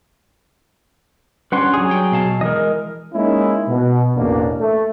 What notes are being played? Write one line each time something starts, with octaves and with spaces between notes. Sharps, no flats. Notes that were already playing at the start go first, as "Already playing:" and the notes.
G3 C#4 D4 B4 F#5 C6
F#3 G#4
C#5 G5
B2 F5 A5
E3 G#3 A#4 D#5
G#3 A#3 C#4 D#4 E4
B2
A1 E2 B2 A#3 D4
A3